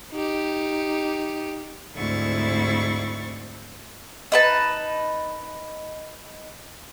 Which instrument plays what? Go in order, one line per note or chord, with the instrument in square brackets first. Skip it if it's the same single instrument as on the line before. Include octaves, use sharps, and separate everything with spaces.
[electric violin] D#4 G4
[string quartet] D2 G#2 C4 E4 C#6 A6
[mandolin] D#4 B4 A5